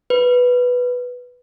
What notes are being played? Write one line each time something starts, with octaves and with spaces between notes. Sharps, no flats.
B4